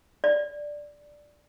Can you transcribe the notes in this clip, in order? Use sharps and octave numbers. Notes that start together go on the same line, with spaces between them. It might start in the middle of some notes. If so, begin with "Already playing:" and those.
D5